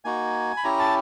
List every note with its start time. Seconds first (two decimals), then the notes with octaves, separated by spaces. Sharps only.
0.05 A#3 D#4 F#4 G#5
0.57 B5
0.64 C#4 E4 G4 A#5
0.79 A5